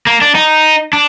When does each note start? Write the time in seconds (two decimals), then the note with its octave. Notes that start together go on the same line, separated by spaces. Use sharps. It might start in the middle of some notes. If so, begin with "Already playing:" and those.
0.07 A#3
0.22 D4
0.35 D#4
0.93 D4